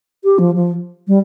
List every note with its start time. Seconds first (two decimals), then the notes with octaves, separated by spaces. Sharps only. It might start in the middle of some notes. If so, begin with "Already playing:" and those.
0.24 G4
0.39 F3
0.55 F3
1.08 G3